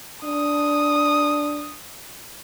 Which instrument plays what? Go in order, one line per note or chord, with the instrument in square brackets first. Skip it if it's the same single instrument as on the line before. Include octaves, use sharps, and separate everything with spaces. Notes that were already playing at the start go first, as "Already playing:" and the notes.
[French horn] D4 [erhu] D#6